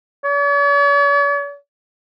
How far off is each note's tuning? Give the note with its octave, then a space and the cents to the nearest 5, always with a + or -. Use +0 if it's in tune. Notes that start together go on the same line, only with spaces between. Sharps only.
C#5 +45